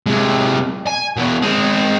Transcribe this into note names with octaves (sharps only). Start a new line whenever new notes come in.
C3 G#3
G#5
E2 B2
G#3 C4